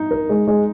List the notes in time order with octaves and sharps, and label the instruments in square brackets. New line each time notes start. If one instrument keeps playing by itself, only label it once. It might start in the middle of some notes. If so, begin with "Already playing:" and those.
Already playing: [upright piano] D#4
[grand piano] A#4
G#3
G#3